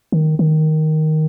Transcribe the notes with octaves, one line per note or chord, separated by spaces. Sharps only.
D#3
D#3